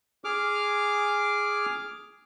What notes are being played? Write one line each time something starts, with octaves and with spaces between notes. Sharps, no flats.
G#4 D6 F6